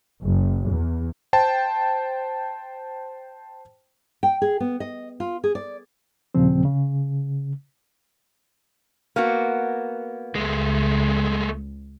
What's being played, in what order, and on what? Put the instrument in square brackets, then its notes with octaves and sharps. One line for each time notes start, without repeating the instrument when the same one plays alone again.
[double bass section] F#1
E2
[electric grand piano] C5 G5 A5
[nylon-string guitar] G5
G#4
B3
D#5
F4
G#4
D5
[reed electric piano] D#2 A#2 C#3 F3 C4
C#3
[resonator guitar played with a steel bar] A#3 B3 F#4
[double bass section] C#2 [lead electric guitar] G#3 A3